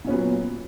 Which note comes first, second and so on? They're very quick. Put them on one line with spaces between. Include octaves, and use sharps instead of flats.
A#2 C#4 B3 F#3